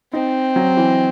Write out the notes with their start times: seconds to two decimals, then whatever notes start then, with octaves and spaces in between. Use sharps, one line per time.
0.13 C4 D#4
0.56 F#3
0.77 E3